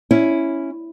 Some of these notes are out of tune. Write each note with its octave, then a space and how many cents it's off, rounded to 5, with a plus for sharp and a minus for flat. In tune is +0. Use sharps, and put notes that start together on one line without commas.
C#4 +0 E4 +0